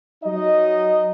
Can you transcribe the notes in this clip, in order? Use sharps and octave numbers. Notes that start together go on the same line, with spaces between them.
F#3 D#4 D#5